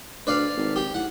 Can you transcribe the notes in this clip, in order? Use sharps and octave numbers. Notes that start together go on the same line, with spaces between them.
D2 B4 D5 F5
G#1
G4
A2 F#5